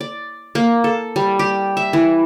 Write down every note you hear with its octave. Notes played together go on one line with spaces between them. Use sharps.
D5
A#3
A4
G3
G4
E5
E3